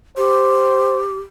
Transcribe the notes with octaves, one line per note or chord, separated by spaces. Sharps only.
G4 C5